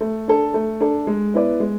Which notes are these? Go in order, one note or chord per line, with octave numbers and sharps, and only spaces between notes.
A3
D4 A4
A3
D4 A4
G#3
B3 E4 B4 D5
G#3